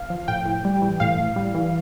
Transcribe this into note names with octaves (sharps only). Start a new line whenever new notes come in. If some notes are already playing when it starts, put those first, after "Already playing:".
Already playing: F5
F3
A2 G5
A2
G3
E3
A2 F5
A2
G3
E3